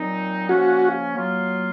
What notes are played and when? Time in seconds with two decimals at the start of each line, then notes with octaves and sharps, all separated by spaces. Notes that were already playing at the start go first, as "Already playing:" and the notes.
Already playing: A#2 F#3 C4 D#4
0.49 C#3 F3 A#3 C#4 F#4
1.15 F#3 A#3 F4